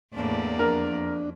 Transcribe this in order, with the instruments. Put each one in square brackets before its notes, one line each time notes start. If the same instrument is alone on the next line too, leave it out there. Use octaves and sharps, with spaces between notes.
[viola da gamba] E2 A#3 D5 [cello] A2 D4
[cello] F2 [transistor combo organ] D4 [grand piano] A#4